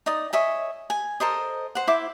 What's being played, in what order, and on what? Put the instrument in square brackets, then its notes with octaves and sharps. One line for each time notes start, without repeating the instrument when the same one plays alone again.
[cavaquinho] D#4 D5 D#6
C#5 D#5 E5 G#5
G#5
A4 A#4 C5 D#5
C5 F#5
E4 C5 E5 D6